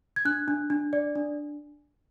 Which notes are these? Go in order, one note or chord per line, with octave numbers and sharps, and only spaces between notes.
G#6
D4 F#6
D4
D4
D5
D4